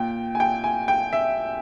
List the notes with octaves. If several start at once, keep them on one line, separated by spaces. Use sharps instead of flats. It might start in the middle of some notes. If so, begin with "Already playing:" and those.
Already playing: A#2 G5
G#5
G5
G#5
G5
E5